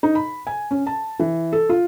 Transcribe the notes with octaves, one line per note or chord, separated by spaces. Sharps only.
D#4
B5
G#5
C#4
A5
E3
A4
F4